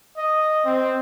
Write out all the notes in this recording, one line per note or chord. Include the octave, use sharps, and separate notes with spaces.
D#5
C4